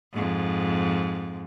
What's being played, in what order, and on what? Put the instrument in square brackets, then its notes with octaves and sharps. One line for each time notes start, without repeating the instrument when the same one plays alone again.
[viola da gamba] F2 G#2